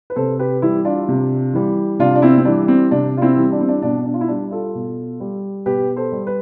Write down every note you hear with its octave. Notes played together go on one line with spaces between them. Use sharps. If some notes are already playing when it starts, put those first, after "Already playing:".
B4
C3 A4 C5
G4 B4
E3 G3 E4 G4
D4 F4
C3
E3 G3
C3 D4 F4
D4
C4 E4
C4
E3 G3 D4
C4
C3 D4
F4
C4 E4
E3 G3
D4
C4
D4
B2 D4
D4
F4
E4
G3 D4
F4 A4
B2
G3
B2 G4 B4
A4 C5
G3
B4